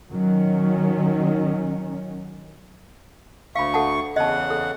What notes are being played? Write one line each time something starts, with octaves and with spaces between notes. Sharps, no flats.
D#3 F#3 C#4
D2 F5 B5 C#6
A4 F#5 A5
E2 C#3 D#5 F#5 A5
A4